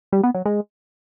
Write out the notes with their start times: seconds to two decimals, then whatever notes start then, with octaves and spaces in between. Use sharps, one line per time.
0.12 G3
0.23 B3
0.34 F#3
0.45 G#3